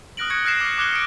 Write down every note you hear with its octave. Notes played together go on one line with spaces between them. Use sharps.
D#6 F6 F#6 A#6 D7 F#7
C#6 F#6 G#6 C#7
F6 F#6 A#6 C7 E7
D6 F6 C7
D6 F#6 G#6 C#7 G7
D6 D#6 D7